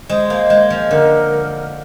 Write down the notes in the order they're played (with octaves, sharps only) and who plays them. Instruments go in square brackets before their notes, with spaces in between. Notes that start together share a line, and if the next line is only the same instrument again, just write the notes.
[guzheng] G#3 [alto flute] C5
[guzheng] A#3
G#3
F3
[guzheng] D3 [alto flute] A#4